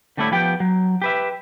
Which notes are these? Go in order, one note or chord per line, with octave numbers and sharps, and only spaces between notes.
D3 G3 A3 D4 E4 C#5
F3 B3 G4 G5
F#3
G4 B4 E5